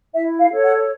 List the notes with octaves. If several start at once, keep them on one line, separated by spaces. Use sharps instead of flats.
E4 E5
F5
A4 C#5
F#5